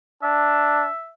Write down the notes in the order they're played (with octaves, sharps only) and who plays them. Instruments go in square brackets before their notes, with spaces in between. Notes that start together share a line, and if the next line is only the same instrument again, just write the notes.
[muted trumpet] D4 [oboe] E5